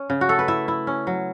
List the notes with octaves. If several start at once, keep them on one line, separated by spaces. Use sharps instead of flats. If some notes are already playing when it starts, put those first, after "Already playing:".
Already playing: C#4
C#3
F#4
A3 A4
B4
E4 E5
E4
C#4
F#3